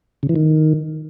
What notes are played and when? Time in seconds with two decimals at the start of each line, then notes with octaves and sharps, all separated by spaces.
0.23 C#3
0.29 E3
0.36 D#3